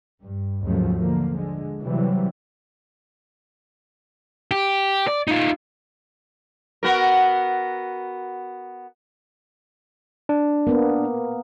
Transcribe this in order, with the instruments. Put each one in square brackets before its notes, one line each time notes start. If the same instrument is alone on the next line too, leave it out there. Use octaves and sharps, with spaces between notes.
[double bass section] G2
D#2 G#2 C#3 F3 F#3 A3
D3 F3 A#3
D3 G#3
C3 E3 F#3 G3
[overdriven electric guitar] G4
D5
D#4 F4
[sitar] B3 F#4 A#4
[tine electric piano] D4
[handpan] A#3 B3